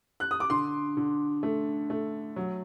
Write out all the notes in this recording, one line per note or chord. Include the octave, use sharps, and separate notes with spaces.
F#6
D#6
D6
D3 C6
D3
A3
A3
F#3